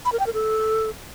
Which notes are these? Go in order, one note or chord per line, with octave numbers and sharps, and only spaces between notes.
B5
A#4
G5
A#4
A4